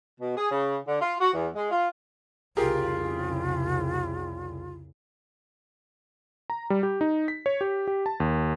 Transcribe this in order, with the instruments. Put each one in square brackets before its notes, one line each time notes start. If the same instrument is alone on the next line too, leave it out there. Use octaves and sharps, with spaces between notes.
[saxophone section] B2
G#4
C#3
D3
F4
F#4
E2
G#3
F4
[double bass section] C2 F2 C#3 [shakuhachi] F4 [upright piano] G4 G#4 A#4
[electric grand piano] A#5
G3
G4
D#4
B6
C#5
G4
G4
A5
D#2